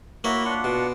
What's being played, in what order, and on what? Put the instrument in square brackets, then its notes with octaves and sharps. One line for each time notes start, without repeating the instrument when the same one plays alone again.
[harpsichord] A#3 C#5 [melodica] E4 F#4 B5
[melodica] D4 F4 F#5
[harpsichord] B2